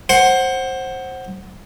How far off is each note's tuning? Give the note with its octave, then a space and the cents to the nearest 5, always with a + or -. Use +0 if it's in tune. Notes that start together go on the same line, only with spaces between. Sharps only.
C5 +20 F#5 +10